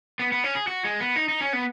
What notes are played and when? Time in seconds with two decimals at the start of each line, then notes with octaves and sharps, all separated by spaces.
0.19 B3
0.32 B3
0.44 C#4
0.55 G#4
0.67 F#4
0.85 G#3
1.00 B3
1.16 D#4
1.29 D#4
1.41 C#4
1.53 B3